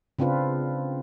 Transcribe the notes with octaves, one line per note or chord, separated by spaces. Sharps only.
C#3 C4 D4 F4 B4